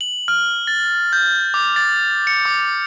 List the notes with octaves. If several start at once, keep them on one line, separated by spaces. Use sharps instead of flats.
F#7
F6
A6
G6
D6
A6
C#7
D6